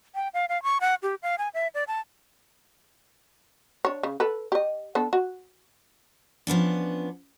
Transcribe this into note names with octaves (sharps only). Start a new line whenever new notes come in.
G5
F5
F5
C#6
F#5
G4
F5
G#5
E5
D5
A5
D4 C#5
C#3
A4 B4
G4 D#5
B3 D4 A4
F#4
F3 B3 C#4 D4